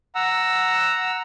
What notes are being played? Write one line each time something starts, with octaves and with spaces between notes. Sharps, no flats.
F#5 A#5 E6